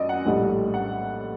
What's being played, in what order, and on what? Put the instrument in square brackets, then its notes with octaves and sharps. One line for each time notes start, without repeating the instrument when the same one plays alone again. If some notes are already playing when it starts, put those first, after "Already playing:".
Already playing: [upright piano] F#2 D5 D#5
F#5
A#1 A2 G3 D#5
F#5